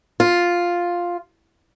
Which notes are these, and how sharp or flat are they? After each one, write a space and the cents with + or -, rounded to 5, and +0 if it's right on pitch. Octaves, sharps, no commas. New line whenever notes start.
F4 +5